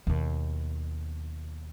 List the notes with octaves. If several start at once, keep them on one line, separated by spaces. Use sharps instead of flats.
D#2 B2